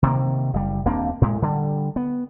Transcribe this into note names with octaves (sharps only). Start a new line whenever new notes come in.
C3 D#3 F3 A#3
F#1 G3
D#1 A#3 C4 D4
A2 G#3
D3 G3
B3